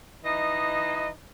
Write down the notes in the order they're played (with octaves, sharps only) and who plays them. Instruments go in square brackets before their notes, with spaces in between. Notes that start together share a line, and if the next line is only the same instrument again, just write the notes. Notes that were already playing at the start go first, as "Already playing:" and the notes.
[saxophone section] E3 D#4 D#5